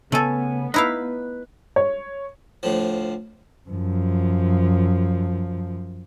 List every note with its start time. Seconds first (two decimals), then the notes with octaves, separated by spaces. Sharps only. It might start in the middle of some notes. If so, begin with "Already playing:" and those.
0.12 C#3 A3 B3 A4 G#5
0.74 D#4 E4 B4 F5
1.76 C#5
2.63 D2 A2 F3
3.69 F#2 F3